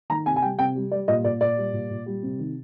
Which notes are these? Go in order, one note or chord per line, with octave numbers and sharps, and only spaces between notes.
D#3 A#5
C3 G#5
G#5
G3 G5
C3 G5
G3
G3 D5
A#2 D#5
A#2 D5
A#2 D5
G3
A#2
A#2
G3
C3
D#3